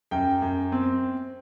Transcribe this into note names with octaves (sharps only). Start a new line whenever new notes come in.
F#2 G5
F#2
C4